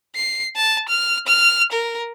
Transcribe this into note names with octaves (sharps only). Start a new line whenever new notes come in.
C7
A5
F6
F6
A#4